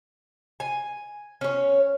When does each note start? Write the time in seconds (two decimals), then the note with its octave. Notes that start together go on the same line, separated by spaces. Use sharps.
0.60 G#5
1.41 C#4 C#5